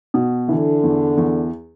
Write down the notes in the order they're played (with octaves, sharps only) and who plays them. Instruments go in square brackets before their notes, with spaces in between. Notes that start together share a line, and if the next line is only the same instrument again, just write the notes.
[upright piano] B2
[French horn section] D3 [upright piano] E3
[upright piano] E2
E2